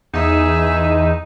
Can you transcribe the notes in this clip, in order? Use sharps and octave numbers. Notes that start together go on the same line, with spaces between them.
E2 D#4 G#4 E5